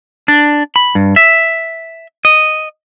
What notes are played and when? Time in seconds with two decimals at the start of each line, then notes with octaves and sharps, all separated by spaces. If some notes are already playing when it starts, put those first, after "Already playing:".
0.28 D4
0.76 B5
0.95 G2
1.16 E5
2.25 D#5